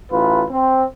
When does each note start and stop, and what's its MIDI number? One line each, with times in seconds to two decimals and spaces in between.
0.11 0.44 33
0.11 0.44 65
0.11 0.44 71
0.50 0.85 60